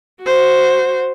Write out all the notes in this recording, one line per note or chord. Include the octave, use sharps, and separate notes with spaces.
F#4 C5